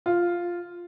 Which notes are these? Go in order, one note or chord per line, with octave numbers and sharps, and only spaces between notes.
F4